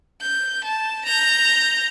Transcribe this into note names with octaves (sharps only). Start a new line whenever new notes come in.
G6
A5
A#5 G6